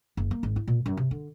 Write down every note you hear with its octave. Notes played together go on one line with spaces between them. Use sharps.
F#1
A#3
G#1
E4
A#2
F#2
C3
D3